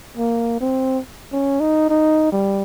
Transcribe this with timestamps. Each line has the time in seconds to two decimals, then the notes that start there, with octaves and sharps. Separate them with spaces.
0.17 A#3
0.61 C4
1.32 C#4
1.60 D#4
1.89 D#4
2.32 G3